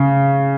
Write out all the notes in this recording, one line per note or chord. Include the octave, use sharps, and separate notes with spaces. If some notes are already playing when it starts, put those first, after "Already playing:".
Already playing: C#3